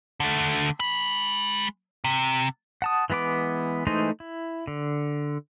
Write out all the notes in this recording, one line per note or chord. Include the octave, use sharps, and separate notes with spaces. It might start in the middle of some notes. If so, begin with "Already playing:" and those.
D3 A3
G#3 B5
C3
F#5 A5 D#6
E3 G#3 B3 B4 D6
E3 G#3 A3 D#4 C5
E4
D3